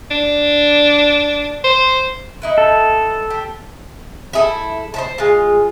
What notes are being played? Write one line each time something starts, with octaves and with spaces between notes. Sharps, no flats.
D4
C5
D#4 E4 B4
A4
G4
E4 G#4 A4
C5 E5 A5
G#3 F4